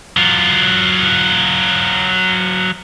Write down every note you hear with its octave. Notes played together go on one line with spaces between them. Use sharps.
F#3 F4